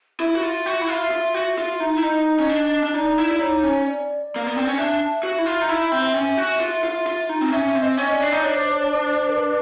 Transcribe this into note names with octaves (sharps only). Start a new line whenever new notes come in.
E4 E5
F#4
F4
F#4
E4
F4
F4
F#4
F4
D#4
E4
D#4 D#5
C#4
D4
D4
D#4 D5
E4
E4
D#4 C#5
C#4
D5
A#3
B3
C4
C#4
D4 E5
F#4
E4
F4
D#4
E4
C4
C#4
F#4
F4
F4
F4
D#4
C4
C#4 E5
C4
D#5
C#4
D5
D4
D#4
D4 C#5
C5
C#5
C#5
C5
A#4
B4